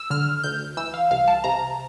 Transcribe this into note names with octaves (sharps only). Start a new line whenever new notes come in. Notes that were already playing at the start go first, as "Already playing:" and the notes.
Already playing: E6
D3 F6
D2 G6
E3 E6
F5
C2 F5
A5
C3 A#5